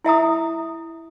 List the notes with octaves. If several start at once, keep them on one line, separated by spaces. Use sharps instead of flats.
E4 E5 A#5 D#6